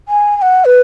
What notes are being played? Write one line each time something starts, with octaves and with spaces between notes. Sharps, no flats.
G#5
G#5
F#5
B4